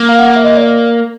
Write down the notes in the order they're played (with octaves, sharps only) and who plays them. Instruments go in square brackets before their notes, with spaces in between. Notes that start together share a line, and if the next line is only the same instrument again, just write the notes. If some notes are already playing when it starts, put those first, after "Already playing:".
Already playing: [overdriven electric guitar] A#3
[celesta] F5
F#5
E5
D#5
D5